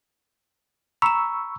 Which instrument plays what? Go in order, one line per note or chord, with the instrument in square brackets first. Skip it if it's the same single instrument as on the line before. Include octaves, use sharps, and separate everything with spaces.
[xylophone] A#5 E7 [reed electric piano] B5 C#6 E6